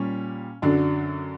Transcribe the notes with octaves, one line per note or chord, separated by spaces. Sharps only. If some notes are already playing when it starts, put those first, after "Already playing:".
Already playing: A#2 G3 C#4
F#2 D3 F#3 D4